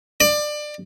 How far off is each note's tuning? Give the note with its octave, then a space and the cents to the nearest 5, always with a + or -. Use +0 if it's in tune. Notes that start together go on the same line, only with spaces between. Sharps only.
D5 +25